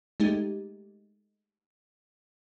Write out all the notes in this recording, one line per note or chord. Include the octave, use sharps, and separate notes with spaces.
G#3 A3 D#4 G4